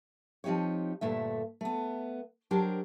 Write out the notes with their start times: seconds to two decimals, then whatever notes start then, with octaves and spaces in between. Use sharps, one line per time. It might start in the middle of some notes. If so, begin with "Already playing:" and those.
0.44 F3 C4 D#4 G4 C#5
1.01 D2 G2 A#2 A3 E5
1.61 A3 B3
2.51 F#3 D4 G4 A#4 C5